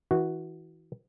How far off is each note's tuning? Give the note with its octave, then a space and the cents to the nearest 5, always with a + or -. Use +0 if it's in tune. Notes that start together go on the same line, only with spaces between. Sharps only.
E3 -30 F#4 +0